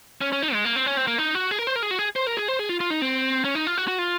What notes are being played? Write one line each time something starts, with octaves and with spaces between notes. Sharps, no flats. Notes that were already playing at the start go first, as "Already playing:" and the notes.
C#4
C#4
D#4
G#3
A#3
C4
C#4
C4
A#3
D#4
F#4
G#4
A#4
C5
A#4
G#4
F#4
G#4
C5
A#4
G#4
C5
G#4
F4
F4
D#4
C4
C#4
D#4
F4
F#4
F#4
F4